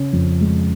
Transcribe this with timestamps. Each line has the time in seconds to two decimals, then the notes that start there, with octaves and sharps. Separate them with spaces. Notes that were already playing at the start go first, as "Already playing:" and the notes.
Already playing: C#3 C#4
0.13 F2
0.41 G#3